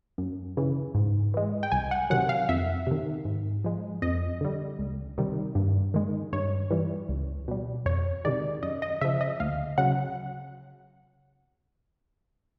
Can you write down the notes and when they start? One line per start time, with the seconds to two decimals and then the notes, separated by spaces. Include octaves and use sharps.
0.18 F#2
0.57 C#3 E3
0.95 G#2
1.34 E3 G#3
1.63 G5
1.72 C2 G#5
1.91 F#5
2.10 C3 D#3 F#3 F#5
2.29 F5
2.49 F2 E5
2.87 C3 D#3
3.25 G#2
3.64 F3 G#3
4.02 F2 D#5
4.41 D3 G3
4.79 C#2
5.18 C3 D#3 G3
5.55 G2
5.94 D#3 G#3
6.33 G2 C#5
6.71 E3 G3
7.09 C#2
7.48 B2 G3
7.86 F2 C#5
8.25 C3 D#3 G#3 D5
8.63 F#2 D#5
8.82 D#5
9.01 C#3 F3 E5
9.21 D#5
9.40 D2 F5
9.78 C#3 F#3 F#5